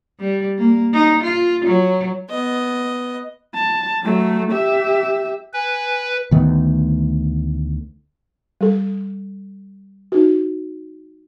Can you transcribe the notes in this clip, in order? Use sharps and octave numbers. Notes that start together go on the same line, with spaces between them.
G3
A#3
D#4
F4
F#3
B3 D#5
A5
F#3 A3
G4 E5
B4 G#5
D2 D#3 A3 B3
G3 A4
D#4 F#4